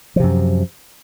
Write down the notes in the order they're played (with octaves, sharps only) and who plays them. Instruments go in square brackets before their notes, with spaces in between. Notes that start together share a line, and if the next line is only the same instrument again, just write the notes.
[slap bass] F3
C3
F#2